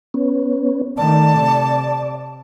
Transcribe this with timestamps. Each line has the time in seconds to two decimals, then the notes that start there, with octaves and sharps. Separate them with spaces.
0.14 B3 C#4
0.98 D#3 A3 D5 A5
1.39 C3